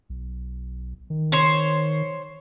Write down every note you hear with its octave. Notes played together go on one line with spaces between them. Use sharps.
B1
D#3
C5 C#5